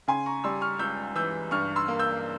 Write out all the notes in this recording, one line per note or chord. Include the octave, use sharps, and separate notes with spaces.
C#3 G#5 C6
A#5 C#6
G3 C6 E6
C#6 F6
C#2 E6 G6
E3 E6 G6
G2 C#6 F6
C6 E6
A#3
E6 G6